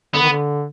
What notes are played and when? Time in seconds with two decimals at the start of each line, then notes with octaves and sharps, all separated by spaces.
0.14 D3 B3
0.22 D#3
0.30 D3